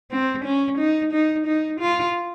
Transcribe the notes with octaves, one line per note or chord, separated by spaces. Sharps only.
C4
C#4
D#4
D#4
D#4
F4